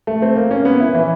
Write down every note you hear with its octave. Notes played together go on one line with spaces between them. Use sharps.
A3
C4
A#3
C#4
B3
E4
E3